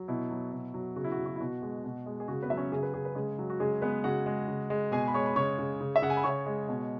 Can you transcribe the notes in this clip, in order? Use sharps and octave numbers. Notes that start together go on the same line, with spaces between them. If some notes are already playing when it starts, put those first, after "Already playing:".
Already playing: F#3
B2 E4
F#3
B2
F#3
C#3 F#4
E4
F#4
C#3
F#4
E4
B2 F#4
G#3
B2
G#3
G#4
C#3 F#4
B3 B4
F#3 E5
C#4 C#5
C#3 G#4
B4
C#3 G#4
B4
C#3 G#3 G#4
F#3
F#4
C#3 G#3 G#4
G#3 B3 B4
C#3 F#4 F#5
G#3
C#3
G#3
B2 G#4 G#5
B5
G#3 C#5 C#6
B5
C#3 C#5 C#6
C#3
C#3
E5
C#3 F#5
G#5
B5
C#3 C#5 C#6
G#3
B2